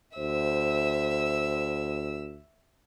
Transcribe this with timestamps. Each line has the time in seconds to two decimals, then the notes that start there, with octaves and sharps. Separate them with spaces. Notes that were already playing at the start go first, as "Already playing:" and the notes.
0.18 D2 C5 E5 E6